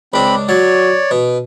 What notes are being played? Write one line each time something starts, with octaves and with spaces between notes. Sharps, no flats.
C#2 C4 D4 B5
F#3 C#5 D5
B2